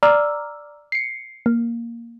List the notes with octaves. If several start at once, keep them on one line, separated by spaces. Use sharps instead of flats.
D5 A#5 D6 E6 F6
C7 C#7
A#3